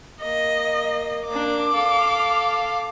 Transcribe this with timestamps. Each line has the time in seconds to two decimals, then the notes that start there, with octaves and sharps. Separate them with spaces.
0.22 A#3 D#5
1.27 A#3 D4 D6
1.73 A4 F5